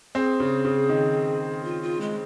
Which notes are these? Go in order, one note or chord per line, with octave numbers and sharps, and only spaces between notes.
C4 G#4
C#3
C#3
D#3
F4
F4
G#3